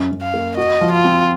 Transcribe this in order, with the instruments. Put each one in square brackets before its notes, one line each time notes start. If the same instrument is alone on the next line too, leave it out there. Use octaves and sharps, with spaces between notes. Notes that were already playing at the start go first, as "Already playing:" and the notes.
Already playing: [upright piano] F#2
F#2
[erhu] F5
[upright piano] A#3
[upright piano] F#4 [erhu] D#5
[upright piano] F3
[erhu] F4
[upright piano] C4